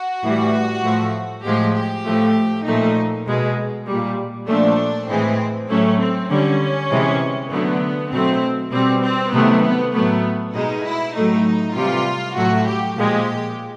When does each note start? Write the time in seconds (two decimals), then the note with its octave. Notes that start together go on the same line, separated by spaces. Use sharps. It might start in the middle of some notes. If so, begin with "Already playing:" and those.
Already playing: F#4
0.24 A2 E3 G3
0.84 A2 F3 A3
1.44 A2 F3 G#3 G4
1.76 G4
2.06 A2 F3 A3
2.66 A#2 F3 A3 D#4
3.27 B2 G#3
3.87 A#2 G3
4.48 A#2 F3 A3 D4
5.09 A2 E3 G#3 C4
5.69 A2 F#3 A3 C#4
5.99 C4
6.30 D3 G3 C#4
6.91 C3 E3 G#3
7.51 D3 F#3 A3 B3
8.11 B2 F#3 A3 C4
8.72 B2 G3 C4
9.03 C4
9.32 C3 D#3 F#3 A3 B3
9.64 B3
9.94 A2 F#3 A3 B3
10.54 B2 G#3 D#4
10.85 E4
11.15 A2 F#3 A3 D#4
11.76 C3 E3 G3 F4
12.36 A2 F#3 A3 F#4
12.66 G4
12.96 A#2 F3 G#3 G4